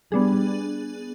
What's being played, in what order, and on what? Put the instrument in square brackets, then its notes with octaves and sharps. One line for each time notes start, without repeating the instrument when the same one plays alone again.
[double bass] G3 [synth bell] B3 D4 G#4